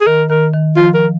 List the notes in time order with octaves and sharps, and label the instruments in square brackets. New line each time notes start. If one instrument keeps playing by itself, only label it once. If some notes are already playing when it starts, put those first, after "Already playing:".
[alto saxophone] G#4
[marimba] D#3 [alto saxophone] A#4
[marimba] D#3 [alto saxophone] A#4
[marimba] D#3
[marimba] F3 [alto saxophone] F4
[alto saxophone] A#4